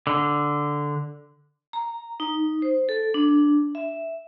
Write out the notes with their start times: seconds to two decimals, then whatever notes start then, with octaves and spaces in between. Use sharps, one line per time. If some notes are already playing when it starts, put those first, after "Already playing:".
0.07 D3
1.73 A#5
2.20 D#4
2.62 C5
2.89 A4
3.14 D4
3.75 E5